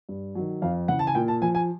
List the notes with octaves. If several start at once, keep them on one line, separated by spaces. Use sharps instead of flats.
G2
D#3 F#3
F2 F5
C#3 E3 F#5
A5
G#5
A#2 G5
A5
F3 G#5
G#5